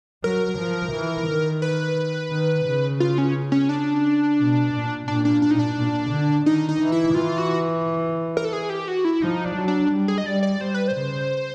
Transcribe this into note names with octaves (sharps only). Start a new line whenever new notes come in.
F#3 A#4
F3
E3
D#3
B4
D#3
C#3
F4
C#4
C#4
D4
B2
A#2
A#2 D4
D4
D4
D#4
D4
A#2
D3
D#3 D#4
D#4
E3
E4
E3 F4
F#4
A#4
A4
G#4
G4
F#4
E4
F3 D#4
D4
F#3
D4
G3
G#4
D#5
G3 D5
D5
G3 C5
B4
C5
C#3